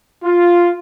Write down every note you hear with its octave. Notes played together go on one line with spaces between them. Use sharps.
F4